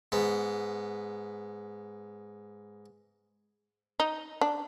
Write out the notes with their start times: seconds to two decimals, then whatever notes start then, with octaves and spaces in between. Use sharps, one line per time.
0.12 G#2 B3
4.00 D#4
4.41 D4